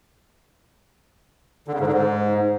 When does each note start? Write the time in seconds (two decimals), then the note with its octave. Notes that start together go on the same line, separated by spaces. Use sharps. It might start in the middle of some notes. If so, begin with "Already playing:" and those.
1.68 D3
1.74 C#3
1.80 G#2
1.87 D3
1.93 G#2